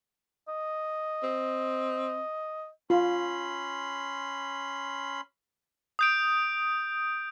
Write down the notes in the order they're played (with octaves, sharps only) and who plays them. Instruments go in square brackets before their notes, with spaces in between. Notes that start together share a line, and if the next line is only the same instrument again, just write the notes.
[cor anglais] D#5
[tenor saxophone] C4
[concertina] C#4 B5 C6 [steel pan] F4
[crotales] D#6 G6 D7